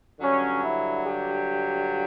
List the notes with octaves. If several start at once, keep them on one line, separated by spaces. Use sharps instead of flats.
G2 D3 F#3 C#4
E4
G4